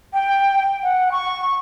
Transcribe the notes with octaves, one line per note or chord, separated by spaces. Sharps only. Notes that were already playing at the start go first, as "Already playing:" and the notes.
G5
F#5
C#6